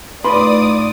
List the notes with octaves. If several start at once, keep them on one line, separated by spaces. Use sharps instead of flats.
A2 D#4 F4 B4 D5 B5 C6 D#6